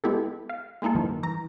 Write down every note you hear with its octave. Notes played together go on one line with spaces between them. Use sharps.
G#3 B3 E4 G4 A4
F5
G#3 A#3 D#4 E4 A4
G2 D#3 F3
E3 A#5